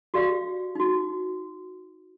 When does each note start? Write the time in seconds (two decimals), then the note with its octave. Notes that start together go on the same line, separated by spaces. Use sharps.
0.14 F#4 G4 D5 F5
0.75 D#4 F#4